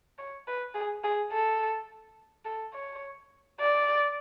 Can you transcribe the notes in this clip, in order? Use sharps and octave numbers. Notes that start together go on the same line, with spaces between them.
C#5
B4
G#4
G#4
A4
A4
C#5
D5